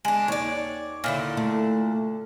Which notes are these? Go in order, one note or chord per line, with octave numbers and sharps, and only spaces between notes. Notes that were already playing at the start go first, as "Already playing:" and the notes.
G#3 D4
D#2 C#5 D5
A#2 D3 E4
A3